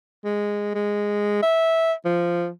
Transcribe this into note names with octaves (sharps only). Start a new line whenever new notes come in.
G#3
G#3
E5
F3